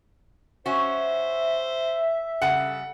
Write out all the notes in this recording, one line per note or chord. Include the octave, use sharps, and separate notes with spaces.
C#4 F#4 C5 E5
C#3 G3 A4 F#5